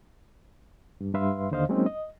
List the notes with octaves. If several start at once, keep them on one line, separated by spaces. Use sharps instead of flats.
G2
G2 B4 E5 F5 C6
D#2 D3 C5 D#5 F5
F#3 G#3 A#3 C4 C#4 D#4
D#5